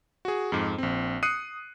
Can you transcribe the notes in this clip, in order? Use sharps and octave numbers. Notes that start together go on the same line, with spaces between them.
F#4 G#4
F2 G#2
A#1 C4
D#6 F#6 C7 C#7 D#7